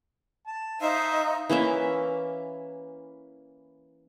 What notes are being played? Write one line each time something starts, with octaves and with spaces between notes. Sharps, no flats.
A5
D#4 C5 E5 F5
E3 A#3 C#4 E5